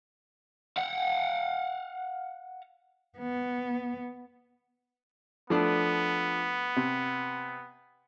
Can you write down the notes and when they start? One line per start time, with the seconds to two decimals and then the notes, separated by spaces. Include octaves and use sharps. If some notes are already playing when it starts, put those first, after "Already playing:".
0.78 F5 F#5
3.18 B3
5.50 F3 A3 B3 D4
6.76 C3